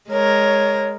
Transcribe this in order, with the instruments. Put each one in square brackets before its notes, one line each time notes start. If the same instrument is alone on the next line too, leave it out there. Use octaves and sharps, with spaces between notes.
[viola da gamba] G#3 A#4 [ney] C#5